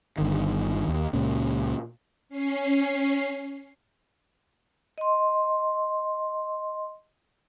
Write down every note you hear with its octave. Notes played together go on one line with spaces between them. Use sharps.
G1 D3 D#3
D#2
C#2 A#2 C#4
C#4 C7
D#5 C6